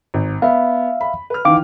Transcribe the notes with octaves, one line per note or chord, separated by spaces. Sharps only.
G#1
B3 E5 F5
B5
B4 F6
D#3 E3 F5 D6